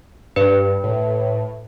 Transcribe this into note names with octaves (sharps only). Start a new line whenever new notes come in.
G2 B4
A2